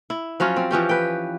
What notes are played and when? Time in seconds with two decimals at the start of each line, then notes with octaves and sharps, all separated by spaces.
0.10 E4
0.40 F3 F#3 C#4 F4
0.56 C4
0.71 E3 F3 C#4 G4
0.89 B4 G5